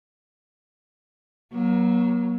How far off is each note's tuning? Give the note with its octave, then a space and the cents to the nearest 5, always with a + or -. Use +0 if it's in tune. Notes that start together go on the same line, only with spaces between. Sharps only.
F#3 +5 A#3 +40